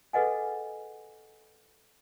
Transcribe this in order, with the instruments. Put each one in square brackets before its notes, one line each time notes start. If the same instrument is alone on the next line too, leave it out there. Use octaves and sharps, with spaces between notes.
[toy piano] G#4 A4 B4 D#5 F#5 G#5